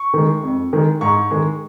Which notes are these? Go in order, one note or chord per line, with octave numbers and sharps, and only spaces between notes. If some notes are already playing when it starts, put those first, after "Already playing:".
Already playing: C#6
D#3 G#3
F2
D#3 G#3
G#2 C#6
D#3 G#3